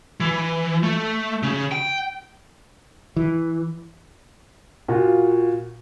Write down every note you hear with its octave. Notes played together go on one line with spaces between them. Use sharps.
E3
A3
C#3
G5
E3
A#2 F4 F#4